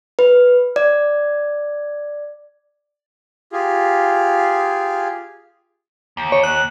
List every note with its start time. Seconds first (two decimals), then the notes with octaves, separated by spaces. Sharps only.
0.19 B4
0.76 D5
3.53 F4 G4 G#4
6.17 D#2
6.32 C#5
6.44 F#6